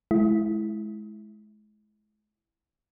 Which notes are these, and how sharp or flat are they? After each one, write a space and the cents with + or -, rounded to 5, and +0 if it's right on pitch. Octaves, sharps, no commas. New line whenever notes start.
G#3 +35 E4 +0